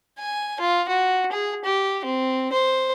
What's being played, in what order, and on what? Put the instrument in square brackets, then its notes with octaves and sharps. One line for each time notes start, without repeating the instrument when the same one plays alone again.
[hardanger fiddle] G#5
F4
F#4
G#4
G4
C4
C5